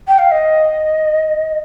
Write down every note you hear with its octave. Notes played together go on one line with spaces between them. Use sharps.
G5
F5
D#5